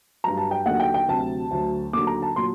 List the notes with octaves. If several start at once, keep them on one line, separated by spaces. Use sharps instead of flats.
G2 F#3 A#5
A5
G5
D#2 D3 F#3 F#5
G5
G5
D2 C3 F#3 A5
D2 D3 F#3
D#2 D3 F#3 D6
A#5
A5
A#2 F#3 C6